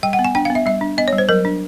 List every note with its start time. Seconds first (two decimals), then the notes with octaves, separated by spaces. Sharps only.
0.03 G3 G5
0.13 F#5
0.19 B3
0.25 G#5
0.35 D4 G5
0.45 B3 F5
0.55 E5
0.66 G3 E5
0.81 D4
0.98 B3 D#5
1.08 C#5
1.13 G3
1.18 C5
1.29 F#3 A#4
1.45 D4